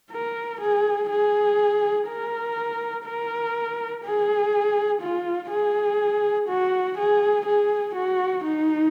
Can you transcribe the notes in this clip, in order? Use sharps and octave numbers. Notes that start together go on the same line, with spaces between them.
A#4
G#4
G#4
A#4
A#4
G#4
F4
G#4
F#4
G#4
G#4
F#4
D#4